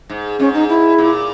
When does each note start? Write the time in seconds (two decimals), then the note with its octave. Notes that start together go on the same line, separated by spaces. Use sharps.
0.09 G#2
0.39 G#2 C#4
0.54 D#4
0.69 E4
0.98 A#2